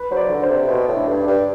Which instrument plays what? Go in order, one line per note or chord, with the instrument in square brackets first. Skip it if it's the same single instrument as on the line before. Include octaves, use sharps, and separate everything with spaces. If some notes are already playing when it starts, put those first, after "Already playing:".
Already playing: [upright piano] B4
[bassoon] F#3 [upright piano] C5
[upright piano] D5
[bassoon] D3
[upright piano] C5
[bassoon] C3
[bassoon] B2 [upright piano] C5
[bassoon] A2
[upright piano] D4
[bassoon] G2
[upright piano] D4
[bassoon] G2